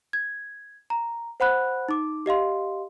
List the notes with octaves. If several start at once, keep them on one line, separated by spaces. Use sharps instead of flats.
G#6
A#5
C5 F#5 B5 F#6
D#4 D6
G4 D#5 F5 C6